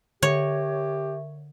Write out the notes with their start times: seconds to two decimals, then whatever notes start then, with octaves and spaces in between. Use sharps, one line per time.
0.23 D3 G4 A#4 C#5 E5 C#6